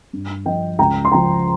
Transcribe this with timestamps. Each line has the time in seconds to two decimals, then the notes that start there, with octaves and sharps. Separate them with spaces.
0.13 G2
0.45 F3 D#5 G5
0.79 C#2 G5 A#5
1.05 C6
1.12 C#3 F3 G5 A#5